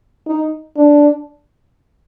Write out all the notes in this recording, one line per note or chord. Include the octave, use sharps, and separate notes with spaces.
D#4
D4